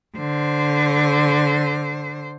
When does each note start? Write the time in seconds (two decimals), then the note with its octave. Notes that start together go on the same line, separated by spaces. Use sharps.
0.17 D3 C5